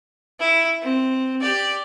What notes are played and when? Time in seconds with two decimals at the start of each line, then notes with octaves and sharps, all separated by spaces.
0.40 E4
0.83 C4
1.41 G4 D5